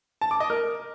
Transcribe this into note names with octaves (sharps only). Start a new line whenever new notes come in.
A5
D6
D#5
A#4